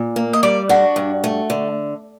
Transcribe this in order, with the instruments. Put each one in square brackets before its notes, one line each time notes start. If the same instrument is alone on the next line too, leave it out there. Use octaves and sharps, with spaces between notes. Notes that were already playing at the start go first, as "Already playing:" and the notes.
Already playing: [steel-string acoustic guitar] A#2
A#3
[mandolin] D#5
[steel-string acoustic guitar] G3 [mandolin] D5
[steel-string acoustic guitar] D4 [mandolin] F#4
[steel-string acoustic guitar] G2
A3
D3